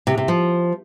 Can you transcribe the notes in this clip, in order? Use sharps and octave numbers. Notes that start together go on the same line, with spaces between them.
C3
C3
F3